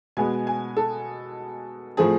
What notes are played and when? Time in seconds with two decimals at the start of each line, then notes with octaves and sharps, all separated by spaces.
0.17 B2 G#3 B3 G#5
0.47 G#5
0.77 A4
1.97 A2 F3 A3 C4 G#4